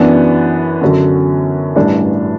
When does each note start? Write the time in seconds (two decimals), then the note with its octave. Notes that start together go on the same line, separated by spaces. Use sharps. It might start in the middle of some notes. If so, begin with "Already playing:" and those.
Already playing: F#2 E3 B3 D4
0.81 F#2 D3 F#3
1.76 A1 G2 E3 G3 D4